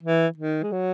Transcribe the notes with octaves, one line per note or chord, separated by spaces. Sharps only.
E3
D#3
G#3
F#3